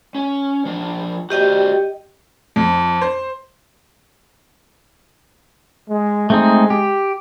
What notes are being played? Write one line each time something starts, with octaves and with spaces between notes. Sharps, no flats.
C#4
F3 D4
F#4 G4 C5 D5 D#5 G5
F2
C5
G#3
G#3 A3 C4 D#4
G4